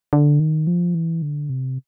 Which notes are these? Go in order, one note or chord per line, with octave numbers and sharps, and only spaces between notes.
D3
D#3
F3
E3
D3
C3